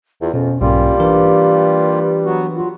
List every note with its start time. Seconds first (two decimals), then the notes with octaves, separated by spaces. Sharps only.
0.22 E2 F4
0.34 F2 B2 C#4
0.61 B1 G#2 G3 A#3 C#4 F4 G4
1.00 E3 D4 A#4 B4
2.25 F#3 B3 F#4
2.56 F#3 F4 F#4